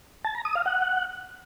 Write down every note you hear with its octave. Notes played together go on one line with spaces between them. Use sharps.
A5
A#5
D#6
F5
F#5